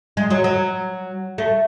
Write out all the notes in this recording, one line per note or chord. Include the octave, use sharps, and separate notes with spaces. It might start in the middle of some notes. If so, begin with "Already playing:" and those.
G#3
F#3
F#3
A3